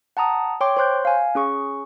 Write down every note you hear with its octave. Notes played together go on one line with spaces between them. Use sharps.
F#5 A5 A#5 D#6
C#5 G5 C6 D6
C5 C#5 C6 F#6 G6
F5 G#5
C#4 G#4 C#6